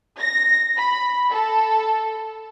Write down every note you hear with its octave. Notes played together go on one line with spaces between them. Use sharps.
A#6
B5
A4